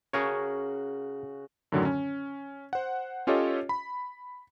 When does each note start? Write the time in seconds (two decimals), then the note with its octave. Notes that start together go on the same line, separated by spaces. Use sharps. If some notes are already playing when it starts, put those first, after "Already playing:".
0.13 C#3 F#4 G#4 A#4 C#5
1.72 F#2 A2 D3 D#3 F#3
1.85 C#4
2.73 C5 F#5
3.27 C#4 F4 G4 A4 C#5 D#5
3.69 B5